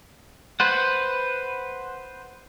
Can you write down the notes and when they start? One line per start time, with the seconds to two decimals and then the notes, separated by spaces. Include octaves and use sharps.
0.60 B4 C5 F#5